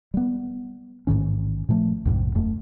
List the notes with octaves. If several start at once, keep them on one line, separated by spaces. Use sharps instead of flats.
G3 B3
A1 G#2 D#3 C#4
A#2 F3 A3
A#1 F2 G#2 C3
E1 F#2 A3